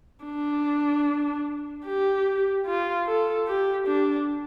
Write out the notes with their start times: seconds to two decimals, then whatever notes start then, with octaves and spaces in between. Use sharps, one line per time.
0.25 D4
1.86 G4
2.66 F4
3.07 A4
3.48 G4
3.87 D4